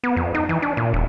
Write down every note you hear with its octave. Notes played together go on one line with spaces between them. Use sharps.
B3
F2
D#4
E3
D4
A#2
E1